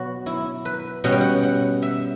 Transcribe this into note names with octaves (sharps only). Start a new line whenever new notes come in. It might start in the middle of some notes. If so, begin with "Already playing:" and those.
Already playing: B2 F#3 B3 F#4
E4
B4
B2 G3 C#4 F#5
G5
F#5
F#5
E5